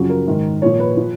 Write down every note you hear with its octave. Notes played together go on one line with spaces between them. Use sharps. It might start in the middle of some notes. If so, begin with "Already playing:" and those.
Already playing: F#2 C#3 F3 F#4
A#4
G#2 D#3
A#2 F3 C#5
B4
F3